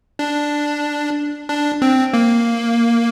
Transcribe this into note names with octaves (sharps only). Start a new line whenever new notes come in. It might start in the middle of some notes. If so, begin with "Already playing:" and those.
D4
D4
C4
A#3